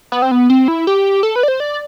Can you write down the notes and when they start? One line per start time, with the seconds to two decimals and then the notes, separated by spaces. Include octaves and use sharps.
0.12 B3
0.22 C4
0.31 B3
0.50 C4
0.68 E4
0.87 G4
1.23 A4
1.36 B4
1.43 D5
1.48 C5
1.60 D5